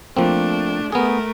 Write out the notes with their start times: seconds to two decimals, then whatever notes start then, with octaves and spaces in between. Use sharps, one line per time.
0.17 F3 A3 A#3 C4 D4
0.92 A3 B3 G#4 A#4